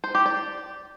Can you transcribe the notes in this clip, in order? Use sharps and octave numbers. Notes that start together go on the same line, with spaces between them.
C5
G4
D5